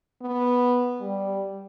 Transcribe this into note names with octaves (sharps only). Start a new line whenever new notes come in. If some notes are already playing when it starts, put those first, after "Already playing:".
B3
G3